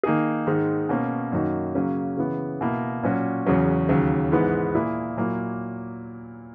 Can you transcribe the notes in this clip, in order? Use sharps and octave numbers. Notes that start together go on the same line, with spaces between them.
D#3 A#3 D#4 G#4
G#2 D#3 G#3
B2 A#3 C#4
F#2 D#3 A#3 D#4 F#4
C#3 F#3 A#3 C#4
C#3 E3 B3
B2 A#3 E4
A#2 F#3 C#4 F#4
E2 C#3 F#3 C#4
D#2 C#3 F#3
G#2 E3 G#3 B3
A#2 A#3 E4 G#4
A#2 F#3 A#3 E4